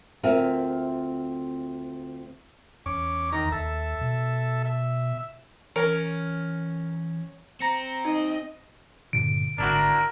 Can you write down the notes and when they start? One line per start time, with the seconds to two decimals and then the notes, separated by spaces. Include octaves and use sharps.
0.23 D2 C4 F4 A#4 E5 G#5
2.86 E2 C#4 D6
3.32 D#3 A#5
3.52 D#2 A4 E5
4.01 B2
4.65 E5
5.76 E3 C#4 A#4
7.60 C4 A#5 A#6 C#7
8.05 D#4 D#5
9.13 G2 A#2 D3 D7
9.58 G#1 D3 D4 E4 F#4 A#4